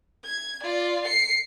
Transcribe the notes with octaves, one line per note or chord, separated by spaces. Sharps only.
G#6
F4 D5
C7 C#7